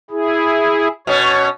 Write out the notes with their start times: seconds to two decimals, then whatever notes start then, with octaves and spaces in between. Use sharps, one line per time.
0.11 E4 G#4
1.07 B2 C#4 C#5